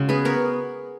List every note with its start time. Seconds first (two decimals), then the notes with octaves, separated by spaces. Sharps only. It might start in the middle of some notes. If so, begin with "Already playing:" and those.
Already playing: C#3 G#3 E4 F#4
0.09 B3 G#4 B4
0.25 B3 A#4 C#5